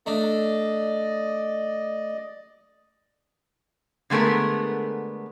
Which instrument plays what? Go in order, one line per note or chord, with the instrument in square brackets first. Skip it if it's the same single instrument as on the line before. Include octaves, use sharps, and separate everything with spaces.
[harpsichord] A3 D4 [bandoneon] D5 D#5
[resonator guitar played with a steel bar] D3 G#3 A3 B3 A#4